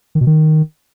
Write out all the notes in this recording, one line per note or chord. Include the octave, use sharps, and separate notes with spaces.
D#3
B2
D#3